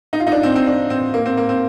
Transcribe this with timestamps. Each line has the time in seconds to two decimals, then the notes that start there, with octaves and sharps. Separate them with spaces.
0.13 D#4
0.20 F4
0.27 D#4
0.32 D4
0.43 C4
0.55 C4
0.67 D4
0.90 C4
1.14 A#3
1.26 C4
1.37 A#3
1.49 C4